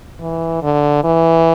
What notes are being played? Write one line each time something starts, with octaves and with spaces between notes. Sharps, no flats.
E3
D3
E3